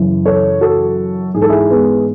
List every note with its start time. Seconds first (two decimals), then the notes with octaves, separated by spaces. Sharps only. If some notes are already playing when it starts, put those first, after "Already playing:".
Already playing: F#2 C#3 E3
0.25 A4 C#5
0.61 F#4 A4
1.34 G#2 E3 G#4
1.42 A4
1.49 E4 G#4
1.70 G#3 B3